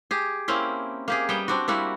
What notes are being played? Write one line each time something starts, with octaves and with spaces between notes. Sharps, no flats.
G4 G#4
A#3 C4 C#4 E4
A#3 G4 G#4
G3 B3 G5
C4 D4 F#4
G3 A#3 E4 F#4